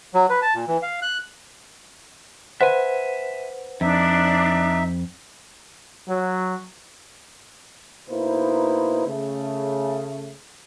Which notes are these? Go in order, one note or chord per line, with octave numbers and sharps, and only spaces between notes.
F#3
B4
A5
A#2
E3
F5
F#6
B4 C5 E5 F#5 G#5
F2 D4 D#4 E5
F#3
B2 A#3 D#4 E4 B4 C5
C#3 A3